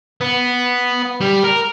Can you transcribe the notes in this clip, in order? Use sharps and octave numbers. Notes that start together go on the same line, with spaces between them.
B3
G3
A#4